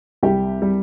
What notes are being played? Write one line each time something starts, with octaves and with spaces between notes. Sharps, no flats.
C2 G3 G4
G3